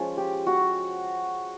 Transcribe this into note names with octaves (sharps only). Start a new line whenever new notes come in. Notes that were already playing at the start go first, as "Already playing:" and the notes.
Already playing: F3 G#3 C#4
G4
F#4